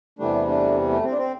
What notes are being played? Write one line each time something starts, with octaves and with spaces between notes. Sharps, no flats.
E2 C3 E3 G3 A3 D4
A3 D4
A3
C4
D4
C4